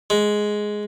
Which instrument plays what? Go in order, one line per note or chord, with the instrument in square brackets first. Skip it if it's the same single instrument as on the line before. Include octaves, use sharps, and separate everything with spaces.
[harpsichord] G#3